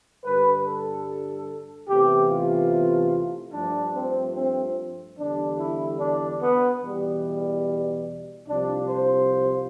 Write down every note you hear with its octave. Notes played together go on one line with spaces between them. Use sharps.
G2 D3 G3 B4
A4
E2 C3 E3 A3 G4
F4
G2 F3 A3 D4
C4
C4
E2 D3 G3 D4
E4
D4
B3
E2 B2 G3
C2 C3 F3 D4
C5